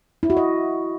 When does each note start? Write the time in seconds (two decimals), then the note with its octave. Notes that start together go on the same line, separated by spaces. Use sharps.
0.23 E4
0.30 F#4
0.37 D#5